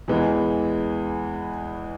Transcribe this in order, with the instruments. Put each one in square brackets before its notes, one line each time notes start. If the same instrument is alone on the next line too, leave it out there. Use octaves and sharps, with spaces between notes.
[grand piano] E2 E3 G#3